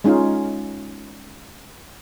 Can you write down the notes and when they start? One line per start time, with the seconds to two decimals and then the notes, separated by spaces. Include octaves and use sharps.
0.04 G#3 C#4 D#4 F4 F5